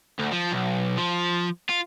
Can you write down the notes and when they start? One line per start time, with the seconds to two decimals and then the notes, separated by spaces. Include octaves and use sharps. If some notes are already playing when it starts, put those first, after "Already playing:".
0.19 D2
0.33 F3
0.52 B1
0.97 F3
1.69 F4